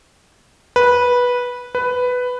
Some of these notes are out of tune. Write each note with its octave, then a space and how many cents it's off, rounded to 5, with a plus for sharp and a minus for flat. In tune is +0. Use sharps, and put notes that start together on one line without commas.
B4 -10
B4 +10